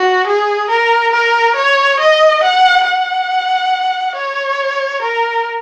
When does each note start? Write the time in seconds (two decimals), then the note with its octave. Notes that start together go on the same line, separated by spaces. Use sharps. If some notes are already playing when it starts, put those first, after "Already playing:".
Already playing: F#4
0.27 G#4
0.70 A#4
1.13 A#4
1.56 C#5
2.00 D#5
2.43 F#5
2.86 F#5
4.15 C#5
5.02 A#4